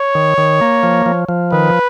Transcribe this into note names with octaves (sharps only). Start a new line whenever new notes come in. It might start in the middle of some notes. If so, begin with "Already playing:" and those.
Already playing: C#5
D#3
D#3
A#3
F3
F3
F3
D#3 B4